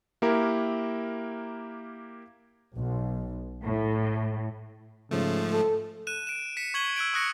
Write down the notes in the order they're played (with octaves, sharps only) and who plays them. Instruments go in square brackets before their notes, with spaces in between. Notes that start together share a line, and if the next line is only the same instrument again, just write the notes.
[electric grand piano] A#3 E4 G4 A#4
[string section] B1
A2
[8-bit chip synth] G#2 F3 A3 [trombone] C#3
[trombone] A4
[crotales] F#6 D#7 E7
D7 E7
B6 C#7 E7
C#6 G#6 F#7 G7
E6 F#6 G#6 D7
C#6 D#6 F#6 A#6 C#7